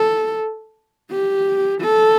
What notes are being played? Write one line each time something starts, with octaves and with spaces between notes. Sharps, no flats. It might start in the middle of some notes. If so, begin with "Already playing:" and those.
Already playing: A4
G4
A4